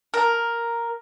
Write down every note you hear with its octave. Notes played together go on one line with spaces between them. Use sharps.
A#4